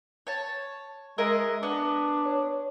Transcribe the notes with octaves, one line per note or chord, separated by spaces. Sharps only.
C#5 A5
G#3 E4 A#4 D#5
B3 D4
C#5